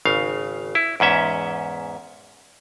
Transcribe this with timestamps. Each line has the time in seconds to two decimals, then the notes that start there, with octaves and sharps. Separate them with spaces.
0.05 G#1 C#3 F5
0.75 E4
1.00 E2 G#2 C#4 E5